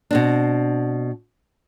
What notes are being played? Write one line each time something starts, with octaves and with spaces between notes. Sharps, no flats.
B2 C4 D4